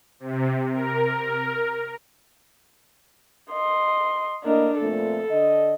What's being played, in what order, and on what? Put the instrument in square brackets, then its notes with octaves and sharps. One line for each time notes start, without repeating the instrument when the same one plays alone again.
[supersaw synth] C3
A#4
[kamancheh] D#5 C6
[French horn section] A2 A#3 D#5 [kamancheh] D4 A#4
[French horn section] F2 A#2 A3 [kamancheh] A4
[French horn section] D3 D#5